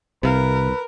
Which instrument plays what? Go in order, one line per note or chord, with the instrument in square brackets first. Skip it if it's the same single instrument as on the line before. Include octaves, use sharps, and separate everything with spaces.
[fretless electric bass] C2 [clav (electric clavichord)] C3 F5 [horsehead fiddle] A#4 [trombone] B4